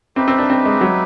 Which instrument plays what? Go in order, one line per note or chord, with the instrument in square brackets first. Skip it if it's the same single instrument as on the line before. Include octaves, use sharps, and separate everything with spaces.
[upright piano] C4 [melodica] D#4 G4 B4 E5
[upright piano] C4
D4
C4
G#3
F#3